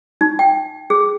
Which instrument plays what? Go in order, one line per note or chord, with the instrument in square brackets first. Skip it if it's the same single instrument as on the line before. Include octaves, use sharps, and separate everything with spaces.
[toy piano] D#4
G5
G#4